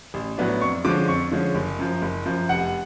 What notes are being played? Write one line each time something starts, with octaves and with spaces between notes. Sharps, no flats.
A1
A2 F#3 B3 D4
F2 C#6
D3 F3 G#3 C#4 D6
F2 C#6
D3 F3 G#3 C#4
F#1
F#2 F3
F#1
F#2 F3
F1 F#5